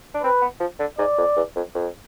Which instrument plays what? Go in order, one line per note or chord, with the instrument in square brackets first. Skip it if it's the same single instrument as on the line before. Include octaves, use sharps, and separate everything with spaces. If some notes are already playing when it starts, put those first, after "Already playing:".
[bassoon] D4
[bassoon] C4 [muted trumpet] B4
[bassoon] B3
F3
D3
[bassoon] G#2 [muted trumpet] D5
[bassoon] F2
E2
F2
F2